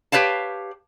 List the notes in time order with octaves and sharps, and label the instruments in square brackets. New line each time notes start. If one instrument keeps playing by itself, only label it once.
[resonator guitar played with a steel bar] G4 B4 C#5 F5 A5